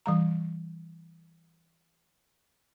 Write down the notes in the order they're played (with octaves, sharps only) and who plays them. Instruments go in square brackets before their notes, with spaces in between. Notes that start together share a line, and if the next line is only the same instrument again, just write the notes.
[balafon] E3 G3 A#5